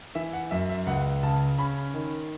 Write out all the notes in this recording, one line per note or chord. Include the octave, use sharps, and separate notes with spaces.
E3 E5
F#5
F#2 E5
E5
C#2 F#5
C#3 A5
C#4 B5
D#3